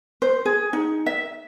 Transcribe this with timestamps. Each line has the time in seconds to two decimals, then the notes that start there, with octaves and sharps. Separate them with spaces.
0.22 C5
0.45 G#4
0.73 D#4
1.06 E5